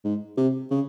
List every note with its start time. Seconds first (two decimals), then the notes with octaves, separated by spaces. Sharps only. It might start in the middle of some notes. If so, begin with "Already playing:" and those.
0.05 G#2
0.37 C3
0.71 C#3